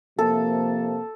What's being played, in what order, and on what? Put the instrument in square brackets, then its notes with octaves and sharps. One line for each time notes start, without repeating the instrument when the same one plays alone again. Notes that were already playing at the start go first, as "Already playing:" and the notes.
[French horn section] C3 F3 A#3 [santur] A4